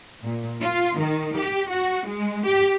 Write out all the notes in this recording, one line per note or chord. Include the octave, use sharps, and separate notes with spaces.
A#2
F4
D#3
G4
F#4
G#3
G4